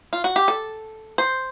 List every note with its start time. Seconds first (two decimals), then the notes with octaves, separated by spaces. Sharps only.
0.13 F4
0.24 F#4
0.36 G4
0.48 A4
1.18 C5